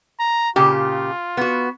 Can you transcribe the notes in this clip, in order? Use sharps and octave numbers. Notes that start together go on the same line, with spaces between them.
A#5
A#2 C#3 F4 G4
B3 F#4